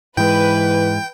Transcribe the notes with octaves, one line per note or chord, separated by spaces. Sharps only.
G#2 E3 G#3 B4 G5